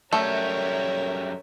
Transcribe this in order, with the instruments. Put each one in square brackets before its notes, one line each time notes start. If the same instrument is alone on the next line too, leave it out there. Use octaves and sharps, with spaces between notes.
[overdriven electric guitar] F#2 G3 [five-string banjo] A3 [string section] A#4 C#5 E5